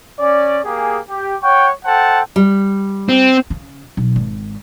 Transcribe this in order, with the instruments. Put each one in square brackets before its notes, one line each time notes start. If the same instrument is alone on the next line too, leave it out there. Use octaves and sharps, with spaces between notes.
[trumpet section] C#4 D5
A#3 G4 G#4
G4
C#5 F#5 G5 C#6
A4 C5 F#5 G5 A5
[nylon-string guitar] G3
[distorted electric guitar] C4
[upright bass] C#3
B1
G#1